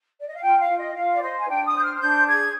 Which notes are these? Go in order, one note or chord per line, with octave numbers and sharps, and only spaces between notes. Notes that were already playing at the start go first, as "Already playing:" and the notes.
D5
D#5
F5
F4 G5
F5
F4
D#5
F4 F5
D5
C5 D#5
G#5
D4 G5
D#6
C5 G6
F6
F6
D4 G6
G#4 G#6